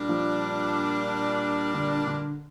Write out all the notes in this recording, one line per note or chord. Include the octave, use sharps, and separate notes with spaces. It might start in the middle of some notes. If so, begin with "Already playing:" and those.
Already playing: A#2 G3 D4 A#4
F3
D3
D3